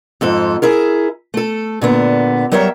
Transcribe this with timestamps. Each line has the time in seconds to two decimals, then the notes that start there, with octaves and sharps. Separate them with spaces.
0.21 F2 G#2 A4
0.62 E4 G#4 A#4
1.34 A3 A4
1.81 A#2 D3 B3
2.52 F#3 G3 A#4 C#5 E5